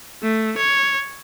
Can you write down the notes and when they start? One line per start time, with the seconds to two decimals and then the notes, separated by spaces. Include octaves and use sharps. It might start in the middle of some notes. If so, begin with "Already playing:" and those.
0.22 A3
0.57 C#5